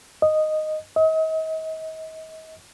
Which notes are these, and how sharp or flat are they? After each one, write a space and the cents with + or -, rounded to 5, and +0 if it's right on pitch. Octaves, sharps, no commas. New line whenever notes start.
D#5 -5
D#5 +40